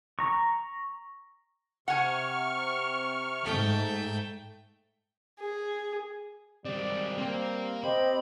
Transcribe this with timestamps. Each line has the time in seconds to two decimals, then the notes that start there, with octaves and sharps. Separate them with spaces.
0.19 A#5 C#6
1.88 C3 F#5 G#5 C#6 F6
3.44 G#2 A3 G5
5.39 G#4
6.65 G3 G#3 C4 D5
7.18 A#3 C4
7.84 C4 G4 D#5 B5